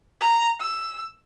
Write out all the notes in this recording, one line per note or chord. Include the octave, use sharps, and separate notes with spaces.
A#5
E6